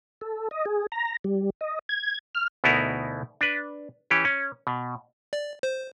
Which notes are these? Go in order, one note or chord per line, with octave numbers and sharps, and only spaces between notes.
A4
D#5
G#4
A#5
G3
D#5
G#6
F6
D2 B2 B3 D#4 E4 A#4
D4 B4
E3 C#4 G4
C#4
B2
D5
C5